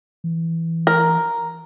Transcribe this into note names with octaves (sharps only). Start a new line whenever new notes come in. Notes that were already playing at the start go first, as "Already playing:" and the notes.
E3
A#4